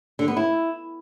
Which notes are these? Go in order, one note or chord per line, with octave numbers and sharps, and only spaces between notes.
D3
B3
E4